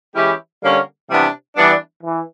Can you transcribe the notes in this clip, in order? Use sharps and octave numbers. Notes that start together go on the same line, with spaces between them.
E3 G#3 C#4 E4 G4
D3 G3 A#3 C#4
C3 E3 G3 B3 D4
E3 G3 B3 D4
E3